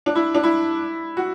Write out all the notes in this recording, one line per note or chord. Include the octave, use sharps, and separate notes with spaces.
D4
E4
D4
E4
F#4